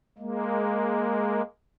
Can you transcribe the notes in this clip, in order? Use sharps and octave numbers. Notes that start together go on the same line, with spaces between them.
G#3 A#3